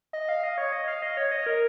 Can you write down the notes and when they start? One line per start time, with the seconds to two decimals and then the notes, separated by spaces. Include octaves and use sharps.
0.13 D#5
0.29 F5
0.43 D#5
0.58 C#5
0.72 D#5
0.88 F5
1.02 D#5
1.17 C#5
1.31 D#5
1.46 A#4